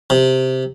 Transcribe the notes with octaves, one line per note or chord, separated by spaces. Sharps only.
C3